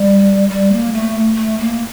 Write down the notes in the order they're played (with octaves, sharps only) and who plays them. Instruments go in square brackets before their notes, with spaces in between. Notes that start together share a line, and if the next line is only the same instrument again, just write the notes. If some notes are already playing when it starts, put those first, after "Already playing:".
Already playing: [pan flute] G3
G3
A#3
A3
A3
A#3